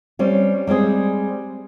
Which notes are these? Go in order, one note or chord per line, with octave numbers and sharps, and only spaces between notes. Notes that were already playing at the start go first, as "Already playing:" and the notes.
G3 C4 C#4
G3 G#3 C4 G#4